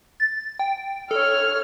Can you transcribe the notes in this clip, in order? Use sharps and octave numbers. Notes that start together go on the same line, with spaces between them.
A6
G5
A4 C#5 F6